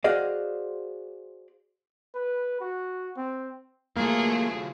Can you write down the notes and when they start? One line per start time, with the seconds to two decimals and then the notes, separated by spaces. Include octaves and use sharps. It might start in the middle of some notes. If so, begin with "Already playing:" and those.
0.04 F#4 G#4 C5 D5 D#5 F5
2.14 B4
2.61 F#4
3.17 C4
3.97 E3 F#3 A3 A#3 F4 G#4